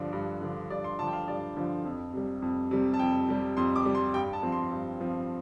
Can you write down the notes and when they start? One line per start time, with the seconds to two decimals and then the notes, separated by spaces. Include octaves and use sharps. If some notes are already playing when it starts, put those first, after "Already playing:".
Already playing: G2 D3 F3 D4
0.13 G2
0.42 D3 F3 D4
0.70 G2 D5
0.84 C6
0.99 D3 F3 D4 A5
1.08 G5
1.13 F5
1.28 G2 D5
1.57 D3 F3 D4
1.85 F2
2.13 C3 G3
2.42 F2
2.71 C3 G3
2.94 A5
2.99 F2 G5
3.28 C3 G3
3.57 F2 C6
3.76 D6
3.85 C3 G3
3.95 C6
4.14 G2 G5
4.33 A5
4.43 F3 C4
4.52 C6
4.72 G2
5.00 F3 C4